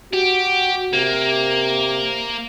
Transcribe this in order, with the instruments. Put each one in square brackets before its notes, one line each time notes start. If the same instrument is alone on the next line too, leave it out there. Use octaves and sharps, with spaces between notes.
[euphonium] F#4 [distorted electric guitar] G4
[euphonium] C3 [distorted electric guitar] A#3